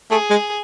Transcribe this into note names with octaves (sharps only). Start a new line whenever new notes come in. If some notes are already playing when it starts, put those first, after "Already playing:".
A3 G#4
G#3